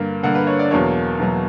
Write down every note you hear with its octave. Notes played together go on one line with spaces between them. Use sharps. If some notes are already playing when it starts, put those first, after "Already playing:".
Already playing: G2 D3 A#3
G2 D3 A#3 F#5
B4
C#5
D5
E2 B2 F#3 A#3 C#5
E2 B2 F#3 A#3